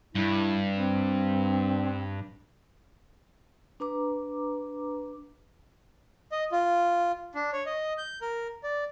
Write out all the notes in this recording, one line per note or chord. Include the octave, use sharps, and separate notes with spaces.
G2 E4
C4
D4 B4 A#5 D6
D#5
F4
D4
C#5
D#5
G6
A#4
D5